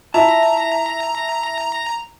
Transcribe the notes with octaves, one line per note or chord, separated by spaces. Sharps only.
E4 F4 A5 A#5